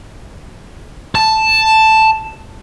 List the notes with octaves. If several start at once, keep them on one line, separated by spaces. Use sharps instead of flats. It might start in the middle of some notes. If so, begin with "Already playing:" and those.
A5